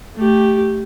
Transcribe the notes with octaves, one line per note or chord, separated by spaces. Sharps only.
A3 G4